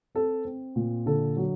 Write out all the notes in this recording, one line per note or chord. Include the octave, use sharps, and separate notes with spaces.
C4 A4
C4
A#2
D3 A4
F#3